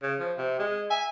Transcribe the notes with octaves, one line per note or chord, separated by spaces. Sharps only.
C#3
F3
C3
G#3
E5 G#5